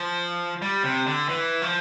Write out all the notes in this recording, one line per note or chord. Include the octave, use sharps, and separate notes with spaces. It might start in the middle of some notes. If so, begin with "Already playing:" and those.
Already playing: F3
G3
C3
D3
E3
F3